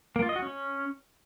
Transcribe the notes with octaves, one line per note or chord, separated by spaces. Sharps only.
A#3
F4
D#5
F#4
C#4